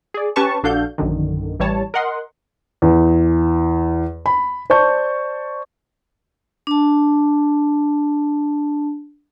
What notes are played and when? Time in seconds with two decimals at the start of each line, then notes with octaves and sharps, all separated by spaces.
0.14 G#4 D5
0.36 C#4 G4 B4 A5 C#6
0.63 A#1 D4 F#4 A4 F5 G6
0.98 A#1 F#2 D3 D#3
1.59 A1 E3 G3 C#5 A5
1.94 A#4 D#5 F#5 C6
2.82 E2
4.26 B5
4.70 C5 D5 A5 C#6 G6
6.67 D4 A5